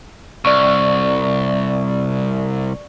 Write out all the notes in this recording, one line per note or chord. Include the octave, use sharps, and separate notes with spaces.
C2 D5 C#6